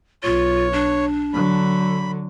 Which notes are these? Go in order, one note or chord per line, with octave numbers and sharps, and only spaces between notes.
B1 F4 C#5
D4
D3 F#3 B5